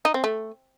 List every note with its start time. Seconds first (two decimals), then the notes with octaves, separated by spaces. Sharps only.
0.05 D#4
0.14 C4
0.24 A3